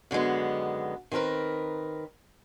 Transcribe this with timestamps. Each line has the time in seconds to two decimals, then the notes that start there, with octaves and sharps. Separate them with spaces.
0.11 F#2 D3 D#3 G#3 B3
1.12 D#3 C4 G#4 A#4 B4